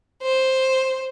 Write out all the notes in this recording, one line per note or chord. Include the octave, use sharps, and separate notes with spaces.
C5